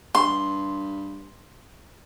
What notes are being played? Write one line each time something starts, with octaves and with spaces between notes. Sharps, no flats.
G2 C6